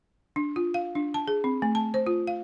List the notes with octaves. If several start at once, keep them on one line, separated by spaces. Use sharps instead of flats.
D4
F4
F5
D4
A5
G#4
C4
A3
A5
C5
F4
F5